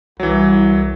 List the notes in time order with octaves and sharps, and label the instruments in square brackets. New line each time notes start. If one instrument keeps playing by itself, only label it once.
[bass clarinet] C2 [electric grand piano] E3 F#3